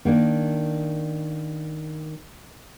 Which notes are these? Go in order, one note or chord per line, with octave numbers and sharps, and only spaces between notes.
D#3 A#3 D4